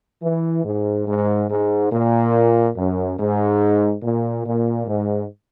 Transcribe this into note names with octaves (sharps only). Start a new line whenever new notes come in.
E3
G#2
G#2
G#2
A#2
F#2
G#2
A#2
A#2
G#2